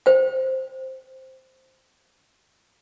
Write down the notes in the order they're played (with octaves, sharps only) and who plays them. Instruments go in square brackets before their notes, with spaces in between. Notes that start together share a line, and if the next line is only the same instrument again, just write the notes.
[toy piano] C5 G5